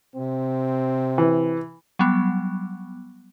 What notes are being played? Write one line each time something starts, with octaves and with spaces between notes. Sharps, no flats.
C3 C4
E3
F#3 G3 B3